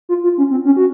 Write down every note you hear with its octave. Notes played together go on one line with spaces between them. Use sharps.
F4
F4
C#4
C4
C#4
F#4